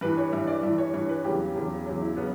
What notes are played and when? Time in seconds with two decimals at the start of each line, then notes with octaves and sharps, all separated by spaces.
0.01 G2 E3 B4
0.17 C#5
0.32 G2 E3 E5
0.47 D5
0.63 G2 E3 E5
0.78 C#5
0.94 G2 E3 C#5
1.09 B4
1.24 E2 C#3 F#3 G4
1.55 E2 C#3 F#3
1.86 E2 C#3 F#3
2.01 E4
2.17 C#3 F#3 B3